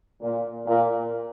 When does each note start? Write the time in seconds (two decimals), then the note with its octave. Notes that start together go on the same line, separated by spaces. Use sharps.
0.20 A#2
0.66 A#2